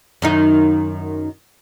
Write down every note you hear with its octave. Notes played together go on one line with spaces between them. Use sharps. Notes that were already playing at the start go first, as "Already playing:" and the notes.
F#2 D#3 D#4